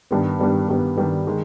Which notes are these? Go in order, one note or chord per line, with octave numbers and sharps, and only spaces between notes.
G2 D#3 G3 B3
G2 D#3 G3 B3
G2 D#3 G3 B3
G2 D#3 G3 B3
D#3 G#3